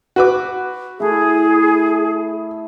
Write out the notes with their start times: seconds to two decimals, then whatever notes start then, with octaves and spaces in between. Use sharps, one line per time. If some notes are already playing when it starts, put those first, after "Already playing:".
0.16 F#4 B4 D6
1.00 A3 E4 G#4